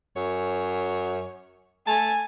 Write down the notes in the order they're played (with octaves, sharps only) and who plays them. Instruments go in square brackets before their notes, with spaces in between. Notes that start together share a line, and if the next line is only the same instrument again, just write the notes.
[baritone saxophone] F#2 [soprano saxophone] C#5
[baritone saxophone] A3 [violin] G#5 [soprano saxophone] A5